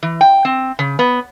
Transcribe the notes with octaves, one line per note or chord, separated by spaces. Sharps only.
E3
G5
C4
C#3
B3